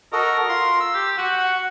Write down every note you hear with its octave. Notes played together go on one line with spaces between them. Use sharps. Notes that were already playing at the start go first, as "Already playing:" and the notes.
F#4 A4 A#4 D#5
F4 C6
E6
G4
F#4 F#5
F#5